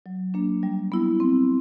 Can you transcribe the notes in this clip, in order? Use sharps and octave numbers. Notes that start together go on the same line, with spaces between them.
F#3
A#3 D4
G3
B3 E4
C4